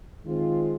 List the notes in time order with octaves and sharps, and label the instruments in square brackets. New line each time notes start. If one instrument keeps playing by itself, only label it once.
[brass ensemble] D#3 G#3 C4 F4